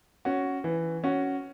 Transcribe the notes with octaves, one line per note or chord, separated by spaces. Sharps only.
C#4 F#4
E3
C#4 F#4